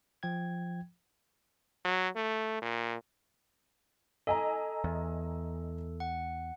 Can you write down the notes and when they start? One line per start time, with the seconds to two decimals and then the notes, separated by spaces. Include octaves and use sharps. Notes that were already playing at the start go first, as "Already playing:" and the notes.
0.23 F3 G5 G#6
1.85 F#3
2.16 A3
2.62 A#2
4.27 A4 D#5 G#5 A#5
4.84 E2
6.00 F#5